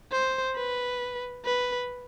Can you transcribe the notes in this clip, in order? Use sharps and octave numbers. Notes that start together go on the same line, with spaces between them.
C5
B4
B4